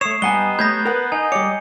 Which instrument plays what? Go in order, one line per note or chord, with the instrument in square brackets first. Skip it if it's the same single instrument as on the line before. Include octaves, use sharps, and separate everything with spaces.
[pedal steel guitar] A3 C#5 [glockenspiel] D#6 C7 E7
[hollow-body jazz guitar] G2 F#5 G#5 [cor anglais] B3 [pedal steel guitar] G4 D#5 [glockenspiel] A#5 G7
[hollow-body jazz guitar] A3 B5 [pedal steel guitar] G4 C#5 D#6 [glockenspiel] G6 G#6 A#6
[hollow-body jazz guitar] A#4 F#5 [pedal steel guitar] B4
[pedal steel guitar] D#4 [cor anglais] D#5 [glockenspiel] G#5
[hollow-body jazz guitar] G3 C#5 [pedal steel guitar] D6 [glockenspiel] C#7